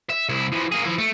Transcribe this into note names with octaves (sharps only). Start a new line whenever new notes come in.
E5
C2 E4
E3 F3
A#3 G#4
F3 E4
A3